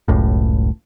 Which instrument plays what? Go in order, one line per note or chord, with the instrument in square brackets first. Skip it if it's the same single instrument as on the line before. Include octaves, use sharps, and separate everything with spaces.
[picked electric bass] F#1 C#2 A2